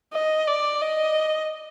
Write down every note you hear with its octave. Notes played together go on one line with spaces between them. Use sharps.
D#5
D5
D#5